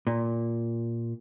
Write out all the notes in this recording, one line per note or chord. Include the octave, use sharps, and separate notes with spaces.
A#2